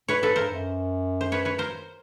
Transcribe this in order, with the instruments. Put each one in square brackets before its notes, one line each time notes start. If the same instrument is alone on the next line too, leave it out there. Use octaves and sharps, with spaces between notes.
[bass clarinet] A#2 [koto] B4 C#5
[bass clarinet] G#2 [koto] A4 B4
[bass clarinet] G2 [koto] A#4 C5
[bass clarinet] F#2
[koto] C5
B4 C#5
B4 C#5
A#4 C5